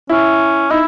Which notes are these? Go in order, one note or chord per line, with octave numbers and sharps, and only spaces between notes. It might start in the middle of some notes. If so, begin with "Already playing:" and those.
C#4 E4
D#4 E4